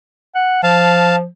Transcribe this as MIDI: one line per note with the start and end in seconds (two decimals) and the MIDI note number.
0.35 0.58 78
0.63 1.27 53
0.63 1.16 77
0.63 1.16 81